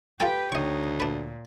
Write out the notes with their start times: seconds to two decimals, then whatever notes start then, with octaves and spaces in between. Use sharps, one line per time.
0.20 F4 G4 A4 B4 G5 G#5
0.52 D2 D#4 C#5 D#5 C#6
1.00 A#2 D4 B4